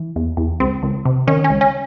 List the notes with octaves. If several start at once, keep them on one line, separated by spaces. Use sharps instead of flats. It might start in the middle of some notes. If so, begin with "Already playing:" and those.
Already playing: E3
E2
E2
C#2 C4
C#2
C3
D#3 C#4
C#4
C#2
C#4